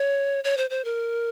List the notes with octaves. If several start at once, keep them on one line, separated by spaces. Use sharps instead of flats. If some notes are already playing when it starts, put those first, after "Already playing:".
Already playing: C#5
C#5
C5
C5
A#4